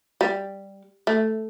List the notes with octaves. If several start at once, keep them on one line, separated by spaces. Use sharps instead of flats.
G3
A3